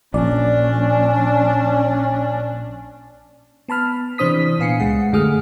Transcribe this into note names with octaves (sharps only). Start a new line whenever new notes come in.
A#1 C#4 D4 D5
B3 A5 B5 F6
C3 E3 D4 C5 D#6 B6
A#2 B3 F5 G#5 C7 C#7
C#2 G#3 F#5
F#2 D3 A3 G#4 D#6 F6